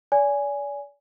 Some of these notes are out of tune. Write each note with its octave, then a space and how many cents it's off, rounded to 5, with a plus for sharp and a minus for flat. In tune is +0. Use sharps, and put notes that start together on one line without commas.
D5 -40 G#5 +0